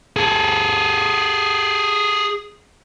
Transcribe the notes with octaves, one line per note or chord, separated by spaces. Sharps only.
G#4 A4